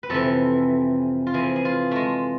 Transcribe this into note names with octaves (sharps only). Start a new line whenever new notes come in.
B4
F2 C3 E3 A4
F4
F2 E3 G#4
G#4
F4
G#3 A3